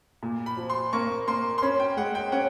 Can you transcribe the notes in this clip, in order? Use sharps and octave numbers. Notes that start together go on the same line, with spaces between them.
A#2
B5
F3
C6
A#3 C#6
A#3 C6
C6
C#4 B5
G5
G#3 F#5
G5
C#4 F#5